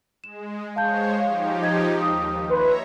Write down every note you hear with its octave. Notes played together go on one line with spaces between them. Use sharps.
G#3 E7
G#3 C5 C#5 F5 A5 G6
F3 D#4 G4 F5
D#5 G#6
D#2 D#6
B4 C#5 E5 A#5 C6